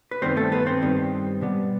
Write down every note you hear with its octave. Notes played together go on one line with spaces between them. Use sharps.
B4
G2 D#3 G3 B3 C4 C5
A3 A4
B3 B4
C4 C5
G2 D#3 G3 B3
B2 G3 B3